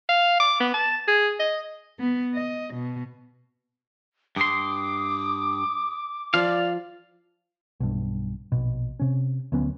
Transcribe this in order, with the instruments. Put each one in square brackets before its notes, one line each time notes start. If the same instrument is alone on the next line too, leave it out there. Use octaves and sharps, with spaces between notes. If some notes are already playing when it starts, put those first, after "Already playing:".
[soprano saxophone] F5
D6
B3
A5
G#4
D#5
[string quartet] B3
D#5
B2
[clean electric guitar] G2 C6 [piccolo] D6 [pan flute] D#6
[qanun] F3 [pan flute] D5 [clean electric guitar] F5
[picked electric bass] B1 G2
A#1 B2
C3 C#4
D2 F#3 B3 C#4